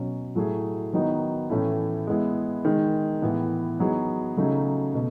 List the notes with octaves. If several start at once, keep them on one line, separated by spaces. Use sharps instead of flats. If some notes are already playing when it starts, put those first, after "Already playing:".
Already playing: B2 F#3 C#4
A2 F#3 A3 E4 G#4
D#3 F#3 B3 D#4
A2 E3 A3 C#4 E4
G#3 B3 E4
D#3 G#3 D#4
A2 E3 B3
F#3 B3 D#4 G#4
C#3 F#3 A3 D#4 G#4
B2 A3